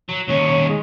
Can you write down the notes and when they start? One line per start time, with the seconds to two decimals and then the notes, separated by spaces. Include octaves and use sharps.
0.09 F#3
0.28 D#2 C#4 C#5
0.47 C#5
0.68 G#3